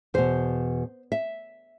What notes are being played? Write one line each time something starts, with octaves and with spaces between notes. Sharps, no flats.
E2 B2 C5
E5